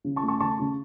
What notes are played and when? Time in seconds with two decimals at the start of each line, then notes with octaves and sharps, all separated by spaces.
0.04 C#3
0.16 A5 C#6
0.23 A3
0.28 A5 C#6
0.40 C#3 A5 C#6
0.60 C#3